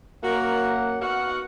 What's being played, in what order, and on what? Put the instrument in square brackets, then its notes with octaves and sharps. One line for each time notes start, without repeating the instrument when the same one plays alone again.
[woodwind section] F#2 F#5 [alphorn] A#3 [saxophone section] F#4 [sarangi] A#4
[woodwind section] B3 C#6 F6 [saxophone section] D#4 F#4 [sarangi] F#5